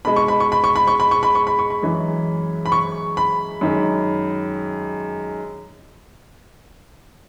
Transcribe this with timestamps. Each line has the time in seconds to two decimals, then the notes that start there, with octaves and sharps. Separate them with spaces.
0.05 B2 G#3 B5
0.16 C#6
0.28 B5
0.40 C#6
0.52 B5
0.64 C#6
0.76 B5
0.87 C#6
1.00 B5
1.11 C#6
1.23 B5
1.35 C#6
1.47 B5
1.59 C#6
1.70 B5
1.83 F#2 E3 G#3
2.66 B5
2.72 C#6
3.17 B5
3.61 F#2 D#3 G#3